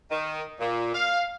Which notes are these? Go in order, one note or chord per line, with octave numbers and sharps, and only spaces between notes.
D#3
A#2
F5